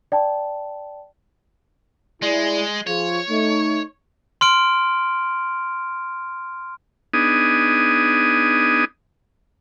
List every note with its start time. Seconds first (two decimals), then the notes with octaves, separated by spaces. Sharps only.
0.12 D5 G5 A5
2.22 G#3 E4 G#4 D5
2.87 F3 F4 G#4 C#5
3.29 A3 D#4
4.41 C6 F6 D7
7.14 B3 D4 D#4 G#4 D#6